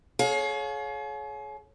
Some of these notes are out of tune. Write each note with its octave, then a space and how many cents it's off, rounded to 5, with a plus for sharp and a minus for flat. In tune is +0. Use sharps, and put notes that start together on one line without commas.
G#4 +40 C#5 +0 F5 +30